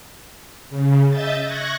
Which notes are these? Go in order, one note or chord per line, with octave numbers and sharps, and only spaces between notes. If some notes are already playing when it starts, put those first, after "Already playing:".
C#3
D#5 E5 G6 A6
C#6 F#6 G#6 A#6